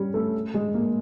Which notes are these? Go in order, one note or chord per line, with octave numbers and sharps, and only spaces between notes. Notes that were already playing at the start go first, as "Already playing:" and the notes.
Already playing: G3 C#4
A3
G#3
A#3